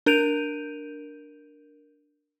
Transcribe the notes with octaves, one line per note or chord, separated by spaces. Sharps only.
D4 A#4 G6 D7 D#7 F7